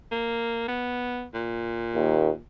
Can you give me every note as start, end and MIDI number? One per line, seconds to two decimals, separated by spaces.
0.11 0.68 58
0.68 1.24 59
1.34 2.39 46
1.95 2.30 39